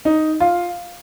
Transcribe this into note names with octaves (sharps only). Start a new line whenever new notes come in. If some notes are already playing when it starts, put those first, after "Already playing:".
D#4
F4